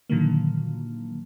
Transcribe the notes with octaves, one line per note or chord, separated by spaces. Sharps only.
A#2 D3 D#3 F3 F#3 A#3